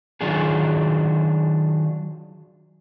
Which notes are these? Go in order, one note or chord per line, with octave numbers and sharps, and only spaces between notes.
D#3 F#3 D4 F4 F#4 G#4